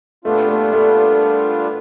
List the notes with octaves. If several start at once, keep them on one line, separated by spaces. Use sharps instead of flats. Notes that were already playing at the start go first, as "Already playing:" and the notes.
A#2 G3 A3 B3 D4 F4
A3
A3